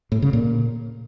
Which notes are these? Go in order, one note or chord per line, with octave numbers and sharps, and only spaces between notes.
A2
C#3
A#2